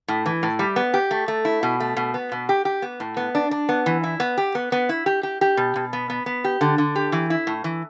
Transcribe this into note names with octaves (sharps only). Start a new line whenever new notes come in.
A2
E3
A2
G3
B3
G4
A3
A3
E4
B2
A3
B2
B3
B2
G4
G4
B3
A2
B3
D4
D4
B3
E3
E4
B3
G4
B3
B3
E4
G4
G4
G4
B2
B2
B3
B3
B3
G4
D3
D3
G4
E3
E4
A2
E3